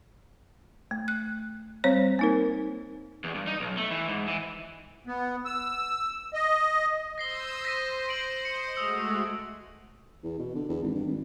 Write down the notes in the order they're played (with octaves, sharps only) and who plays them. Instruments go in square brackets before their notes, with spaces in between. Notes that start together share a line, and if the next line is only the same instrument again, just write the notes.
[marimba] A3
F#6
G3 C4 C5 C#5
A#3 D#4 A#4
[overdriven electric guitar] E2
G2
D#4
B1
A3
E3
G#2
E3
[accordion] B3
E6
D#5
[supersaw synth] C5 D#6 E6 [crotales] A#6 C7 G7
[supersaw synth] C5 [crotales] A#6 B6 D#7
[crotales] B6 D7 F#7
[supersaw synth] C5 D#5 [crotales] C#7
[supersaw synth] G#3 A3 F#4 [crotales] D#6 E6 C#7
[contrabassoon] E2
B2
D3
E2
G#1
G2
G#1